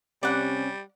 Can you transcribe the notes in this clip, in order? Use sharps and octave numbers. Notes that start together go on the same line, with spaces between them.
C3 G3 C#4 D5 F#5